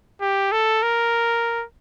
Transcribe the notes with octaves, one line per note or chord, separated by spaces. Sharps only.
G4
A4
A#4